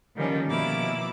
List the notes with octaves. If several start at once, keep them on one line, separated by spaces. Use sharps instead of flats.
D3 D#3 F3 G3 A#3 C#4
B2 F3 A#3 E4 D6